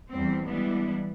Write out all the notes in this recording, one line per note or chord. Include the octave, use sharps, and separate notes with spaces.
E2 G3 C4
E3 G3 G#3 B3 D4 E4